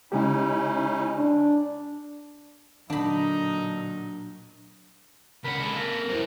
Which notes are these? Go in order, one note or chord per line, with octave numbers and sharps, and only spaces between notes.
C#3 G#3 C#4 D#4 E4 G4
D4
A#2 D3 F#3 D4 D#4 B5
C#2 C#4 A#4 F#5 B5
G#3 A#3 A4
A#4 F5 A#5
F#2 E3 A#4 C5